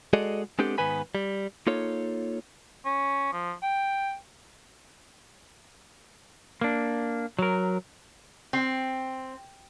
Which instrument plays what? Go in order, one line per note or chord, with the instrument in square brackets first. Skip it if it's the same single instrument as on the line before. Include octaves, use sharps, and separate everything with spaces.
[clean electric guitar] G#3 F#4 G#4 A4 D5 D#5
G#3 B3 C4 D4 G4 A4
G#2 D#3 B3 B4 G#5 B5
G3
A#3 D#4 F4 A4 C#5
[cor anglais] C#4
F3
G5
[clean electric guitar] A#3 D4
F#3 A#4
[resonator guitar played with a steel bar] C4